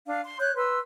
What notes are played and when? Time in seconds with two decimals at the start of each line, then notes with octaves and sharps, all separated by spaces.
0.06 D4 F5
0.24 C6
0.39 C#5 F#6 G6
0.56 B4 C6 E6